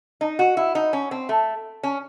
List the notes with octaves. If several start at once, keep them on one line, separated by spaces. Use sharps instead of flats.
D#4
F#4
E4
D#4
C#4
C4
A3
C#4